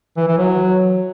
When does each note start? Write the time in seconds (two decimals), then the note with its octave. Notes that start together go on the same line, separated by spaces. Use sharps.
0.17 E3
0.28 E3
0.38 F#3